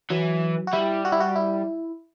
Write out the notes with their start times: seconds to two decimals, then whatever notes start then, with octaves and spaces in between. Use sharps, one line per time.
0.10 E3 F#3
0.67 F#4
0.73 G3 E4
1.05 F#4
1.12 E4
1.20 F#4
1.36 E4